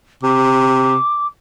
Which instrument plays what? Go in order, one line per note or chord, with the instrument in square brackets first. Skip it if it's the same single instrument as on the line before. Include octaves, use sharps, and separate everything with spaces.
[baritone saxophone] C3 [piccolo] D6